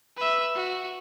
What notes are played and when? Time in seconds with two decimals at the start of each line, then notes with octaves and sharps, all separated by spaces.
0.17 B4 E5
0.55 F#4